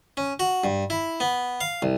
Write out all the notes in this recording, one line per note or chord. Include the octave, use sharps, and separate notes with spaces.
C#4
F#4
G2
E4
B3
F5
C2